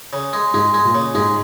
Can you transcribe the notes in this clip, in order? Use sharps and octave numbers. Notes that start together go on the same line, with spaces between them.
C#3
G#3
G#2 G#3
G#3
A#2
C#3
G#2 G#3